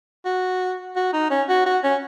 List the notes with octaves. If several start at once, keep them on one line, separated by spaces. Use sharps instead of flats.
F#4
F#4
D#4
C#4
F#4
F#4
C#4